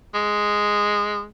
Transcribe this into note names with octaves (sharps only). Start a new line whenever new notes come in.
G#3